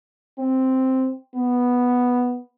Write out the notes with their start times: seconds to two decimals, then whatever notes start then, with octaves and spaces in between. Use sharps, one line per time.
0.39 C4
1.35 B3